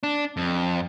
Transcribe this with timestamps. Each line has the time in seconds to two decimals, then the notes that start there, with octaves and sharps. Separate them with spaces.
0.03 D4
0.37 F2